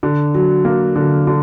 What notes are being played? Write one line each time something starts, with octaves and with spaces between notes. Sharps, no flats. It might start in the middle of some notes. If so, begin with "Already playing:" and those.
D3
F#3
A#3
D3
D3